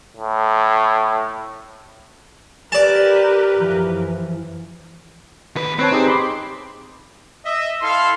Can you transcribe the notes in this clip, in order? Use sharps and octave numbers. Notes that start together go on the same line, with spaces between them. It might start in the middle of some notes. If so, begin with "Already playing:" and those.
A2
G4 A#4 B4 D5 A5
F#2 E3 F3
D#2 B4
C4 B4 C#5 A5
D#4 G4 G#4
B5 C6 D6
D#5 E5
E4 A4 F5 C6